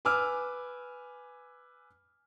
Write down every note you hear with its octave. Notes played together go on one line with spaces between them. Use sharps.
B4 G#5 D6 E6 F6